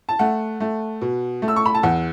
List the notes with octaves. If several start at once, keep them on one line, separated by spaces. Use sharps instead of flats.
A5
A3 F#5
A3
B2
A3
E6
C#6
B5
A5
E2 F#5